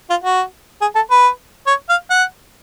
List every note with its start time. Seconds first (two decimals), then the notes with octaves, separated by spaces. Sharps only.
0.10 F4
0.24 F#4
0.82 G#4
0.95 A4
1.11 B4
1.67 C#5
1.89 F5
2.11 F#5